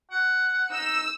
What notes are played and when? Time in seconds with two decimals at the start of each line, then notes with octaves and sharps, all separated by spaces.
0.11 F#5
0.71 D#4 E6